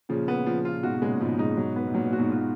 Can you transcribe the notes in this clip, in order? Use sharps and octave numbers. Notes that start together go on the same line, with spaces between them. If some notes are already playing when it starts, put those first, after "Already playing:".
A#2 C#3 F3
B3
F3
F4
A#2
G#2 B2 F#4
B2
A#2 C#3 G#3
G#2 B2 F3
G#2 B2 D#4
F#3
B3
G#2
A#2 F#3
A#2
F#4
G#2 B2
F4